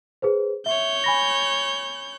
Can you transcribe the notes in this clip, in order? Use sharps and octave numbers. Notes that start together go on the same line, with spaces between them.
G#4 B4 C5
C#5 E5 G6
G#5 B5 A#6